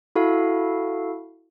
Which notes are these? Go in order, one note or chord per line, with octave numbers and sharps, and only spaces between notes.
E4 F#4 A4 F5